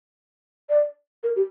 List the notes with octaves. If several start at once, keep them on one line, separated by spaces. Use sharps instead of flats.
D5
A#4
G4